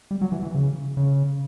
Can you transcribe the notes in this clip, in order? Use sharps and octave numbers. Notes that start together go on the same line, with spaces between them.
G3
F#3
E3
E3
C#3
C#3